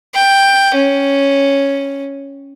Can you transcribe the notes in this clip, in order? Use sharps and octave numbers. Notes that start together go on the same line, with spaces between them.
G5
C#4